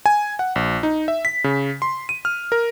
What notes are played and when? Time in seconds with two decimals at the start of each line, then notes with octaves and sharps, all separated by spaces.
0.06 G#5
0.39 F#5
0.56 A#1
0.83 D#4
1.08 E5
1.25 B6
1.44 C#3
1.82 C6
2.09 D#7
2.25 F6
2.52 A#4